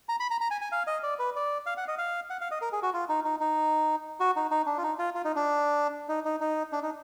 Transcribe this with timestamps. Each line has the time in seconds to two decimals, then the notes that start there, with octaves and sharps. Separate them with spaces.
0.09 A#5
0.20 B5
0.30 A#5
0.41 A#5
0.51 G#5
0.61 G#5
0.72 F5
0.87 D#5
1.03 D5
1.19 B4
1.36 D5
1.66 F5
1.77 F#5
1.88 D#5
1.98 F5
2.30 F#5
2.41 F5
2.51 D#5
2.62 A#4
2.72 G#4
2.83 F#4
2.94 F4
3.09 D#4
3.24 D#4
3.40 D#4
4.20 F#4
4.36 D#4
4.51 D#4
4.66 D4
4.78 F4
4.83 D#4
4.99 F4
5.15 F4
5.25 D#4
5.36 D4
6.09 D#4
6.25 D#4
6.41 D#4
6.72 D4
6.83 D#4